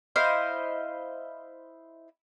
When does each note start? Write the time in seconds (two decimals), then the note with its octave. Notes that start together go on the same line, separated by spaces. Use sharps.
0.16 E4 C5 D#5 F5